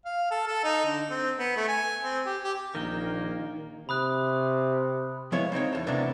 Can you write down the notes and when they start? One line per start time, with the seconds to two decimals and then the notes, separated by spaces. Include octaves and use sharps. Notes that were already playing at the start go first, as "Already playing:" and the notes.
0.05 F5
0.31 A4
0.47 A4
0.64 D#4
0.85 D3
1.10 C4
1.39 B3
1.56 A3
1.68 G#5
2.03 C4
2.25 G4
2.44 G4
2.75 A#1 D#3 A#3 A#4 G5
3.89 C3 B5 D#6 F#6
5.32 F3 G#3 B3 E4 C#5
5.52 A#3 C4 D#4 C#5
5.73 E2 A5
5.87 A2 C3 A#3 B3 D4